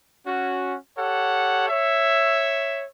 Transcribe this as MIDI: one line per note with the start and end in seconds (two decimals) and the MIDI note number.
0.26 0.75 61
0.26 0.75 66
0.98 1.66 67
0.98 1.66 69
0.98 1.66 73
0.98 1.66 78
1.69 2.85 73
1.69 2.85 76